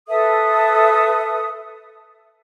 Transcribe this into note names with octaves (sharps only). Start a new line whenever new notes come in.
A4 B4 E5 D#6